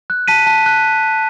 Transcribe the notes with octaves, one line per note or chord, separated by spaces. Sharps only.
F#6
A5 B6 D#7
A5
F#6